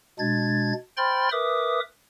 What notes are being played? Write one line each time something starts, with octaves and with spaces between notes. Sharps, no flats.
B2 G#3 D4 G#6 A6
C5 G5 B5 C6 F6 A6
A#4 B4 E5 D6 D#6